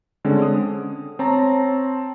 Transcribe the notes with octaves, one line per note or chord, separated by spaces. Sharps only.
D3 G#3 C4 C#4
D#6
C4 C#5 A5 A#5